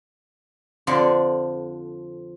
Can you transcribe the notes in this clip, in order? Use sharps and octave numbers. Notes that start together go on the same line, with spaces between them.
F2 D3 F3 D5